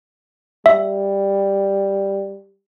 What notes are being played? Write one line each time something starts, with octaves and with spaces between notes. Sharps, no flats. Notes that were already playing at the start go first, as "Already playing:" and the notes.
G3 E5